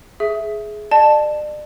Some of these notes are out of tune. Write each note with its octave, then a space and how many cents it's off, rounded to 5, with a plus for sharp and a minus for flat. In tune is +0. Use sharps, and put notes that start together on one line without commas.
G#4 +15 E5 +0
D5 +40 A5 -5